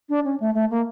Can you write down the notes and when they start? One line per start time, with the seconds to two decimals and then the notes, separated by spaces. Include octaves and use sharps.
0.09 D4
0.25 C#4
0.40 A3
0.54 A3
0.70 A#3